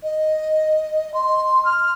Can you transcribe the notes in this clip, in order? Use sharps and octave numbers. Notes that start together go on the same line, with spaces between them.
D#5
C6
F6